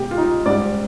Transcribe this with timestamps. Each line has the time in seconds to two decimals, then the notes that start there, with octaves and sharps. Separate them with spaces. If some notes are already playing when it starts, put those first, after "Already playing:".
Already playing: B2 G#3 G4
0.11 F4
0.18 D#4
0.46 G#2 G3 D5